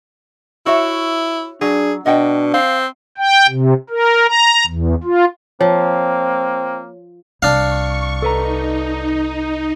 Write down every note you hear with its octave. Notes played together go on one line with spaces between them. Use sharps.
E4 F#4 C#5 E5
F#3 D4 G#4
B2 D4 D#5 F#5 G5
C4 F5
G5
C3
A#4
A#5
E2
F4
F3 A#3 C4 C#5
C2 D4 F5 C#6
D#4 A4 B4 A#5